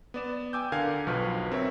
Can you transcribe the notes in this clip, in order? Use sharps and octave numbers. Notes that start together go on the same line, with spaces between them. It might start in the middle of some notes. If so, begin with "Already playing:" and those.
B3 D5 E7
G5 G#5 D6 E6 G6
D3 A#4 F5 G#5 D6 G#6
B1 B2 F3 B4 C#6 F6
C4 A#4 C#5 E5